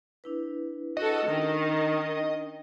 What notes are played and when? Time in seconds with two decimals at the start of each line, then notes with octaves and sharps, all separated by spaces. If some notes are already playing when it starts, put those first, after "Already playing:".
0.24 D4 E4 B4
0.97 F#4 A4 D#5
1.26 D#3 C#4 D4 G5